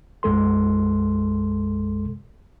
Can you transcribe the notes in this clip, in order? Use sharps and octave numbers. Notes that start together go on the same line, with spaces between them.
B1 F#2 G#3 A4 C6